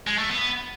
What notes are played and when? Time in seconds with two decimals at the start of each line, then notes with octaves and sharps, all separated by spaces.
0.07 G#3
0.18 A3
0.30 B3